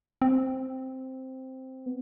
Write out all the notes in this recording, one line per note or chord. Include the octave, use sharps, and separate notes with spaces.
C4
B3